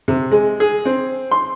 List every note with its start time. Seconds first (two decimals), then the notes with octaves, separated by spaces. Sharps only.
0.08 C3
0.31 G#3
0.60 G#4
0.85 C4
1.31 C6